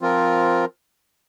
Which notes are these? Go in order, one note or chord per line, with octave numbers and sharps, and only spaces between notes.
F3 C4 F4 A#4